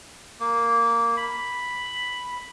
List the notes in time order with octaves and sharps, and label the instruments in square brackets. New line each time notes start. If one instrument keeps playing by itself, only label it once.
[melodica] A#3
B5